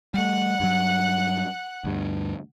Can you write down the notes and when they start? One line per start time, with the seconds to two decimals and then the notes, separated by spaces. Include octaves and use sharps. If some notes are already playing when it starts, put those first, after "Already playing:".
0.14 G3 A3 F#5 F#6
0.60 G2 F#3
1.84 D2 G2